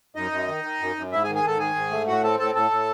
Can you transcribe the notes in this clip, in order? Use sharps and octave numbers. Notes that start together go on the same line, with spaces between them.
F#2 D#4 D#5
F#2
D#3
D#3
F#2
F#2
G#2 E4 E5
G#4 G#5
D#3
G#4 G#5
G#2 A4 A5
D#3 G#4 G#5
G#2
A3
A2 F#4 F#5
C4 A4 A5
A2 A4 A5
A2 A4 A5
A2